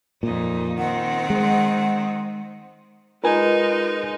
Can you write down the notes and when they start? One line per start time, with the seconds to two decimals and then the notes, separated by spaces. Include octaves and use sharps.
0.23 F2 A#2 D#4
0.78 D#3 C4 F#5
1.30 G#3
3.24 G#3 D#4 F4 A#4 B4 G#5